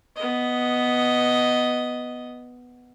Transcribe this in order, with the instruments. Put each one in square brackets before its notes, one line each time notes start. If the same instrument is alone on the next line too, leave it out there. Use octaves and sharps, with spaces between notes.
[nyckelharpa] B3 D#5